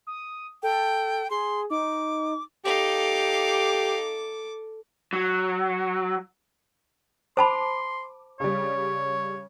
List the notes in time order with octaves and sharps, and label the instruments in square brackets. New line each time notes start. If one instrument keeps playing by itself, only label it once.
[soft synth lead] D#6
[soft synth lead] A4 [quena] G5
[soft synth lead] G#4 [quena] C6
[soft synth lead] D#4 [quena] D6
[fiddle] D#4 F5 [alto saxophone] G4 [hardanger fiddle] A4 D6
[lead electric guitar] F#3
[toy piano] C5 A5 B5 [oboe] C6 [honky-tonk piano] D6
[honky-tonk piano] C#3 G3 [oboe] C#5